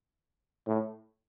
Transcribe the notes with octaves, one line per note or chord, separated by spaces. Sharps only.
A2